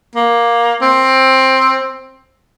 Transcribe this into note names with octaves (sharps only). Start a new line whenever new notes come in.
A#3
C4